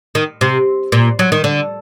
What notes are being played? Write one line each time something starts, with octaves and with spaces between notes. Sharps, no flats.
D#3
C3
A#2
F#3
D#3
D3